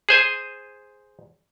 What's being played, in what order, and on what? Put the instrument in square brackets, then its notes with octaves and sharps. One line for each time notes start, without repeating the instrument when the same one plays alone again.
[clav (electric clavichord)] G#4 C5 G#5